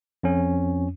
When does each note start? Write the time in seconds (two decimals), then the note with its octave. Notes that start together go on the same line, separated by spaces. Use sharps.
0.23 F2 C#4